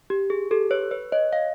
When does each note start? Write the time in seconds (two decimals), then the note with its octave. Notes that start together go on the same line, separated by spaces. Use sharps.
0.10 G4
0.30 G#4
0.51 G4 A4
0.71 B4 C#5
0.91 B4 C#5
1.12 C#5 D#5
1.32 D#5 F5